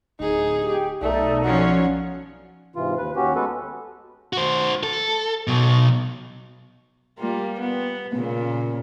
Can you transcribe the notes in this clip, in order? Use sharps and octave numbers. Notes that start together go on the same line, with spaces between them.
D1 D#4 G#4
G4
B1 A3 D#4 A4 D5
F3 C#4 F#4 C#5
G#2 C3 E3 F4
D#2 B4
D#2 C#4 F#4 G4
G#3 B3 F#4 A4 B4
F#4 C5
A4
B2 F#3
G3 A#3 F4
B3
A#2 C#3